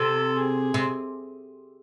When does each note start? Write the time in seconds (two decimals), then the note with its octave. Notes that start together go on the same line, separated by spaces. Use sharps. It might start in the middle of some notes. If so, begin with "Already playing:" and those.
Already playing: C3 A4
0.37 G#4
0.74 C3